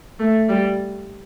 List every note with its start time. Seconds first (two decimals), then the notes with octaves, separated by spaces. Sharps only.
0.20 A3
0.49 G3